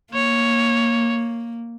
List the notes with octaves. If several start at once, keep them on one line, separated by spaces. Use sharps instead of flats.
A#3 C#5